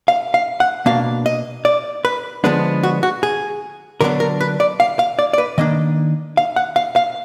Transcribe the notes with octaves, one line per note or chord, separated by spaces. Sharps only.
F5
F5
F#5
B2 A#3 D4 F5
D#5
D5
B4
D3 F3 G#3 B3 D4 B4
F#4
F#4
G#4
D3 F#3 B3 D4 A#4
A#4
B4
D5
F5
F5
D5
D5
B4
D#3 A#3 D4 D#5
F5
F#5
F5
F5